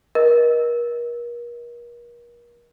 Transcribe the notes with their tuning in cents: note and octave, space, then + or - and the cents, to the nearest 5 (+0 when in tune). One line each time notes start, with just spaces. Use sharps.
A#4 +40 D#5 +0